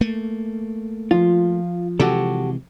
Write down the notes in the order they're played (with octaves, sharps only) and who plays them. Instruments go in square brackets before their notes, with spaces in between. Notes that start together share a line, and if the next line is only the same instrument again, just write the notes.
[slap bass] A3 A#3
[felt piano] F3 [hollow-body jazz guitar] F4
[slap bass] C3 E3 G#3 [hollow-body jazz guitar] F#4 G4 A4